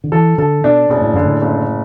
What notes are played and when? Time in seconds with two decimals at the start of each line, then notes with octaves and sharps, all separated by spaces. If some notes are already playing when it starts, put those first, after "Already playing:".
0.04 D3
0.12 E3 A4
0.38 D3 A4
0.64 B2 D4
0.89 F#1 B2
1.01 A2
1.13 F#2 D3
1.24 A2
1.42 F#1